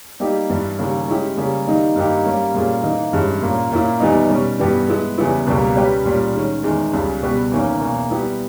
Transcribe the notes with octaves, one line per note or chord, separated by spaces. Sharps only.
G3 A#3 D#4 G4
G2 E3 G3
D#2 C#3 G3 A#3
G#3 C#4 E4 G4
C#3 G3 A#3
D#3 G3 A#3 D#4
G2 D#3 A#3 D#4 G4
G3 A#3 C#4
A#2 G3 A#3 C#4 G#4
E3 A#3 D#4
G2 E3 G#3 C#4
A#2 A#3 C#4
A#2 A#3 C#4 E4
E2 D#3 G3 B3 D#4
B2 G3 C#4
G2 E3 G3 B3 G4
G#3 B3 E4
E2 C#3 G3 B3 E4
C#2 B2 G3 A#3
G3 C#4 G4 B4
A#2 G3 C#4
D#3 G#3 C#4
E2 D#3 G#3
C#2 C#3 G3
B2 G3 B3 G4 B4
E2 D#3 A#3 C#4
E2 B2 A#3
G3 B3 E4 G4